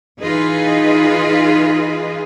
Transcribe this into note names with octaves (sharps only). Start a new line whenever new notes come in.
E3 D#4 F4 G#4 B4 D#5